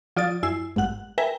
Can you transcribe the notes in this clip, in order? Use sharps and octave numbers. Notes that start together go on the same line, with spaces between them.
F3 F4 D5 D#6 A6
F#2 E4 G#5 E6 C7
G#1 G2 F#5 F#6
A#4 B4 E5 G5 G#5 A#5